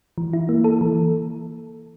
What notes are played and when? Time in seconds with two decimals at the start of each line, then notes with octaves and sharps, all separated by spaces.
0.18 E3
0.33 E4
0.49 A#3
0.64 A4
0.81 E3